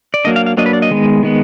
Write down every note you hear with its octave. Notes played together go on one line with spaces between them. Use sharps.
D5
F#3 A#3 D4 D#5
F5
F5
F#3 A#3 D4 D#5
B4
D5
D#5
D#3 G#3 B3
D#3 G#3 B3